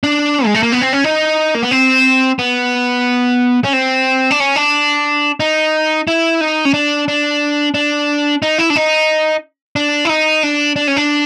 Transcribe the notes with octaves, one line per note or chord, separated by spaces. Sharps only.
D4
G#3
A3
A#3
B3
C4
C#4
D#4
A#3
B3
C4
B3
C#4
C4
D4
C#4
D4
D#4
E4
D#4
C#4
D4
D4
D4
D#4
E4
D4
D#4
D4
E4
D#4
D4
D4
C#4
D4